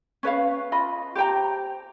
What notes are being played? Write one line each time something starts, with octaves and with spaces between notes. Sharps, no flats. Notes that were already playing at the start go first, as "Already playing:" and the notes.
C#4 B4 C#5 F5
F4 D#5 B5
G4 C5 G5 A#5